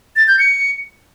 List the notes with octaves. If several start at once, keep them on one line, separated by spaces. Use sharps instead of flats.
A6
G6
C#7